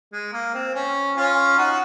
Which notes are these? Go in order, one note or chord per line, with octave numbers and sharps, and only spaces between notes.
G#3
A#3
C4
C#4
C#4 F4
D#4 F#4